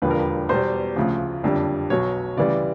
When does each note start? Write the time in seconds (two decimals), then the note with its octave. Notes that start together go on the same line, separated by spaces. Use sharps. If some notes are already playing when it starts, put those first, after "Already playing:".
0.02 E1 D#2 D3 F3 B4
0.11 A#4
0.19 B4
0.49 E2 B2 G3 C5
0.96 D2 C#3 F3
1.43 F#1 F2 D3 G3
1.90 B1 B2 F#3 C#5
2.37 D2 C#3 E3 G3 D5